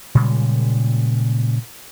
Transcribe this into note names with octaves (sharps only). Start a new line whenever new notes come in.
A#2 C#3 G3 G#3